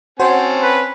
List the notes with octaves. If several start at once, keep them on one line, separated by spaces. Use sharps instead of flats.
C4 C#4 F#4 C5 A5
B4